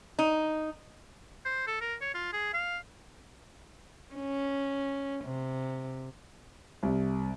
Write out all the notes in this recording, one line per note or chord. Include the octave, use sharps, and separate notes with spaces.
D#4
C5
A4
A#4
C#5
F4
G#4
F5
C#4
C3
C2